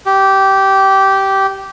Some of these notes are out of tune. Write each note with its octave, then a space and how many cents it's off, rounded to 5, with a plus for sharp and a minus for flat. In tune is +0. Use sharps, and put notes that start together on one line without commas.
G4 -15